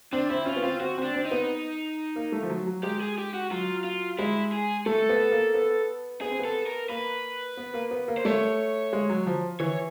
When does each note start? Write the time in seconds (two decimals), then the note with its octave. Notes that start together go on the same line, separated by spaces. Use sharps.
0.13 C4 D4
0.30 C4 E4
0.46 C#4 F4
0.56 B3
0.63 C4 F4
0.80 C4 F#4
0.98 C4
1.03 D4
1.14 C4
1.25 D#4
1.31 B3
2.16 A#3
2.32 A3
2.43 F3
2.49 F#3
2.67 F#3
2.83 G#3 G4
3.01 G#4
3.18 G4
3.34 F#4
3.51 F#3 F4
3.84 F4
4.19 G#3 E4
4.52 G#4
4.86 A3 A4
5.09 B3
5.32 A#3
5.54 B3
6.21 B3 G#4
6.30 C4
6.39 B3
6.45 A4
6.67 A#4
6.89 A#3 B4
7.57 B3
7.74 A#3
7.91 B3
8.08 A#3
8.17 C5
8.25 A3 C#5
8.93 G#3
9.09 F#3
9.26 F3
9.60 E3 C#5